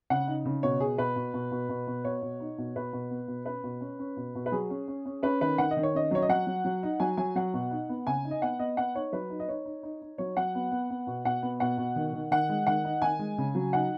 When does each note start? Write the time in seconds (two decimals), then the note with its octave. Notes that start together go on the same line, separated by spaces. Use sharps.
0.10 C#3 F#5
0.27 D#4
0.45 C#3
0.63 B2 C#5
0.80 B2 G#4
0.98 B2 B4
1.16 B2
1.34 B2
1.52 B2
1.69 B2
1.87 B2
2.05 B2 C#5
2.22 B2
2.40 D#4
2.58 B2
2.76 B2 B4
2.93 B2
3.11 B3
3.28 B2
3.46 C#4 B4
3.64 B2
3.81 C#4
3.99 C#4
4.17 B2
4.35 B2
4.46 B4
4.52 F#3 G#4
4.70 C#4
4.88 C#4
5.06 C#4
5.23 C#4 B4
5.41 D#3 B4
5.58 D#3 F#5
5.71 D#5
5.77 D#3
5.83 C#5
5.94 C#4 D#5
6.11 F#3 C#5
6.22 D#5
6.29 F#3 F#5
6.47 F#3
6.65 F#3
6.83 D#4
7.00 F#3 G#5
7.17 F#3 G#5
7.35 F#3 F#5
7.54 B2
7.71 D#4
7.89 B3
8.07 C#3 G#5
8.25 D#4
8.31 D#5
8.42 B3 F#5
8.59 B3 D#5
8.77 B3 F#5
8.94 D#4 C#5
9.12 F#3 B4
9.30 D#4
9.40 D#5
9.48 D#4 C#5
9.65 D#4
9.83 D#4
10.01 D#4
10.18 F#3 C#5
10.37 F#3 F#5
10.55 B3
10.71 B3
10.90 B3
11.07 B2
11.25 B2 F#5
11.42 B3
11.60 B2 F#5
11.78 B2
11.96 D#3
12.13 D#3
12.31 D#3 F#5
12.49 G#3
12.67 D#3 F#5
12.85 D#4
13.02 D#3 G#5
13.19 G#3
13.38 C#3
13.55 F#3
13.73 D#4 F#5